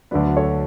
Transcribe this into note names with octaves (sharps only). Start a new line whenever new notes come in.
D2 D3 F#3 B4 D5
A4 C#5